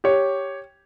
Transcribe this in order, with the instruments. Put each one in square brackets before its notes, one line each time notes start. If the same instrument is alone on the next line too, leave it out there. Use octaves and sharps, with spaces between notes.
[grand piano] G4 C#5